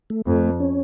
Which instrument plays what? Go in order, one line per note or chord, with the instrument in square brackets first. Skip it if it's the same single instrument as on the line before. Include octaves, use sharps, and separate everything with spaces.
[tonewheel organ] A3
[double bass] F2 [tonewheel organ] A3
[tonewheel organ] C#4